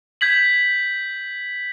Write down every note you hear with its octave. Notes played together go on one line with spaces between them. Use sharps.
G6 G#6 B6 F#7